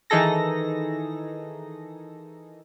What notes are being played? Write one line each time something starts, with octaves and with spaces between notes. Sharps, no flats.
D#3 E3 D#4 G#4 A4 A#6